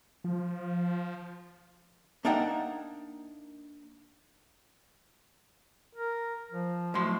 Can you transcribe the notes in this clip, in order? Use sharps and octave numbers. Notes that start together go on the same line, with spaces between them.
F3
A#3 D4 D#4 E5 F#5 G5
A#4
F3
A2 F#3 C6